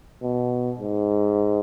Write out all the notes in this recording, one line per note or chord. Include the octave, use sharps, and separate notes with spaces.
B2
G#2